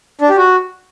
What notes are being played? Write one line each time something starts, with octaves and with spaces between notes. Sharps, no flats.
D4
G4
F#4